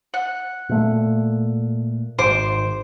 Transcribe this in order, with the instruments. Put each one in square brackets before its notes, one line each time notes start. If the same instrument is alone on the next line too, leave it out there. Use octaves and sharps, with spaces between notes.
[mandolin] F#5
[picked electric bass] A#2 A3
[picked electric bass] G#1 [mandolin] C5 D6